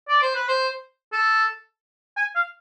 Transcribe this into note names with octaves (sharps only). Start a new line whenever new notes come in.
D5
C5
B4
C5
A4
G#5
F5